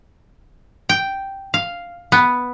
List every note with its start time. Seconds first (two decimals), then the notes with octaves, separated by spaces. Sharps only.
0.89 G5
1.54 F5
2.12 B3